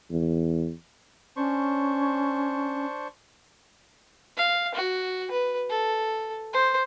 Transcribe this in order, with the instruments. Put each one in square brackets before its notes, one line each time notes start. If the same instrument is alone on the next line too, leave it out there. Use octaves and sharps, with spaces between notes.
[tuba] E2
[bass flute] C#4 [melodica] D4 C5 C#6
[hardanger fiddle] F5
F#4
B4
A4
C5